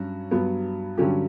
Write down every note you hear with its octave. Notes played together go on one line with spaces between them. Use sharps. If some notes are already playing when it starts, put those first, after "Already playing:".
Already playing: G2 F#3 C#4 F#4
G2 F#3 B3
G2 D3 F#3 C#4 G4